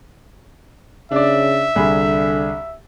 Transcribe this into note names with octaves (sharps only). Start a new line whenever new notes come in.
C#3 D4 D5 E5
C2 D3 G#4 B5